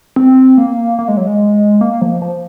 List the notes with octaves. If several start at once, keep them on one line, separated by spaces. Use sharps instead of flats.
C4
A#3
A#3
G#3
F#3
G#3
A#3
F3
F3